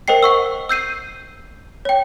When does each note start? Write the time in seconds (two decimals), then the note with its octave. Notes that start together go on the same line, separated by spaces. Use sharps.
0.08 A#4 C5 D#5 G5 C7
0.23 F#5 C#6 E6
0.69 E6 G6 C7 D#7
1.85 C#5 G5